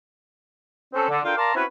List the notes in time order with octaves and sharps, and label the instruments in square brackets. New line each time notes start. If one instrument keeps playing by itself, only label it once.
[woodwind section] C4 C#4 A4
D3
D4 F4 A4 A#4 F5 G5
A#4 D5 F5 A5 A#5 C6
C4 C#4 E4 F#4 B4